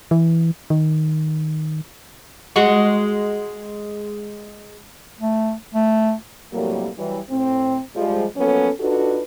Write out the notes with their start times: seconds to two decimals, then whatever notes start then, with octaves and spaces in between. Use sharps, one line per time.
0.11 E3
0.70 D#3
2.56 G#3 F#4
5.21 A3
5.74 A3
6.53 A2 C3 F#3 G3 A#3
6.97 E3 F#3 G3
7.30 A2 C4
7.95 F3 G3 G#3
8.37 F3 F#3 A#3 B3 C#4 A4
8.80 D4 D#4 F4 F#4 A4 B4